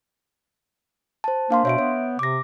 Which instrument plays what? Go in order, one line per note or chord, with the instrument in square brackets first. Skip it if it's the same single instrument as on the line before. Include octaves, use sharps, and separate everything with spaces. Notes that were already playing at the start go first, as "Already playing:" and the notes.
[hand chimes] C5 A5
[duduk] A#3 [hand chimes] D4 F5 C6
[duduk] B2 [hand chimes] C#5 E5 D7
[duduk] B3 [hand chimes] C#5
[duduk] C3 [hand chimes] D6 A#6